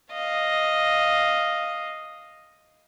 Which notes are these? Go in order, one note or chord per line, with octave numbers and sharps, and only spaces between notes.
D#5 F5